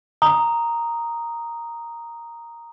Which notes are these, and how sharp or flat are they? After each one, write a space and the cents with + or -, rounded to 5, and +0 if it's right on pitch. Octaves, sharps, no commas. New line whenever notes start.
A#5 +0 D#6 +0